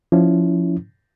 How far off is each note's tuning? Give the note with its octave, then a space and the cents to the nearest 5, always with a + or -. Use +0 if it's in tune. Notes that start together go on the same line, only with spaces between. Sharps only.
F3 +0 C#4 +15 E4 +0